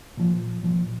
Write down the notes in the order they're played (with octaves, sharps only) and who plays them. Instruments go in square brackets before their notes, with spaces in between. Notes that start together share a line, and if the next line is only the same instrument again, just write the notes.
[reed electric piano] A#2 F3
A#2 F3